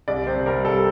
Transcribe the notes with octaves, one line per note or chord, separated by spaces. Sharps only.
C2 D5
C3 C5
G3 A#4
C2 A4